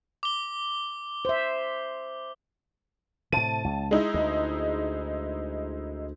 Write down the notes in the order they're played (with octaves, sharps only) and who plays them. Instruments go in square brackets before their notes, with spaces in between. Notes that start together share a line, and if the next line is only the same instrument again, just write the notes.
[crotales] D6 G7
[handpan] C5 E5
[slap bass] A2 C3 [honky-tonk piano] A5 D#7
[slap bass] C#2
[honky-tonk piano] G#3 D#4 E4
[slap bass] D2